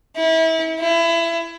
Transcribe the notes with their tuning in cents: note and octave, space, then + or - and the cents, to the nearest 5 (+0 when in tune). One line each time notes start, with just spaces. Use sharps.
E4 -30
E4 +25